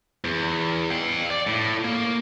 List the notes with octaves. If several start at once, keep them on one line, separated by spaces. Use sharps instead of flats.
E2
F5 G5
D5
A2
A#3